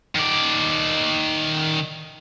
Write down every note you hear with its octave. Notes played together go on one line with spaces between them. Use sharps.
D#3 D5